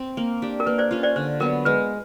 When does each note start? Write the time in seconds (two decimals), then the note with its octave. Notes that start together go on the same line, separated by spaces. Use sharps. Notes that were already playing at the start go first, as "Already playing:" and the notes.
Already playing: C4
0.17 A#3
0.42 D4 G4
0.60 A#4
0.66 A#3 B4
0.78 C5 D5
0.91 C#4 F4
1.03 C5 D5
1.16 D3 C5
1.40 F#3 B3 A#4
1.65 G#3 B4